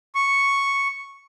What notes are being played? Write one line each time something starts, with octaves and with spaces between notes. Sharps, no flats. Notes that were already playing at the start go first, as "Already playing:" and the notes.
C#6